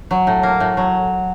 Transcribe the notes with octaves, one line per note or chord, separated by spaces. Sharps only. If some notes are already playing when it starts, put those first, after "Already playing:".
F#3
A2
A#3
A2
F#3